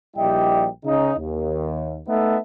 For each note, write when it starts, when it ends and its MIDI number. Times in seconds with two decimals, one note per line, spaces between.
0.16 0.67 34
0.16 0.67 55
0.16 0.67 64
0.16 0.67 67
0.16 0.67 75
0.16 0.67 79
0.85 1.13 49
0.85 1.13 63
1.19 1.99 39
2.08 2.38 57
2.08 2.38 59
2.08 2.38 63
2.08 2.38 69
2.08 2.38 76